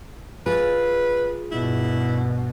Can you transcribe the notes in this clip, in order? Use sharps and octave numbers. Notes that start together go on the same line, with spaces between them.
F4 G#4 B4
G2 B2 E4